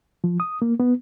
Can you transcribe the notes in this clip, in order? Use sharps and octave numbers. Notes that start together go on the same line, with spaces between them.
F3
D#6
A#3
B3